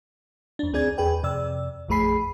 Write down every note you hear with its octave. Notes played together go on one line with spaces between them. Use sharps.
F2 D4
D2 C4 G#4 D5 G#6
E2 G#4 B4 G5
F2 C3 D5 E6
A1 F2 A3 G#4 B5 C7